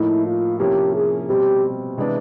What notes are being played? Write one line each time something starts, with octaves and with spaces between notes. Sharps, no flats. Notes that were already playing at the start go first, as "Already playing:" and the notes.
Already playing: A2 F3 A#3 D#4 E4
F4
C3 F3 A#3 C#4 E4 G4
G#4
B2 G3 C4 G4
C3 E3 G#3 B3 D4